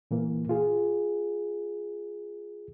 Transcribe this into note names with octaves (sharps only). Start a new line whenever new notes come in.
A#2 E3 A#3
F4 G#4